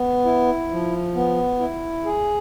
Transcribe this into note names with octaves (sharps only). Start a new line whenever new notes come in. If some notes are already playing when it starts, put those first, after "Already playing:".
Already playing: B3
E4
F3
B3
E4
G#4